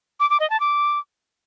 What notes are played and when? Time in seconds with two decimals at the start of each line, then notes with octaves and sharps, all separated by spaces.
0.20 D6
0.30 D6
0.40 D#5
0.50 A5
0.60 D6